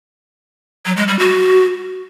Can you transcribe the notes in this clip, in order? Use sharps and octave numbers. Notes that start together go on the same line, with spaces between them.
F#3
G#3
G3
F#4